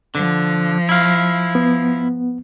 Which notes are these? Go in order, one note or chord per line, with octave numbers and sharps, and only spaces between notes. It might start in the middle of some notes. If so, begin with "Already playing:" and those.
D3 F3
E4 F5
B3